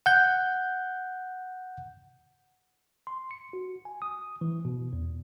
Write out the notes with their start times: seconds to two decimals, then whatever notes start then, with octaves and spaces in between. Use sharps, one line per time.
0.06 F#5 G6
3.07 C6
3.31 C#7
3.53 F#4
3.85 G#5
4.02 D#6
4.41 E3
4.65 B2
4.93 E2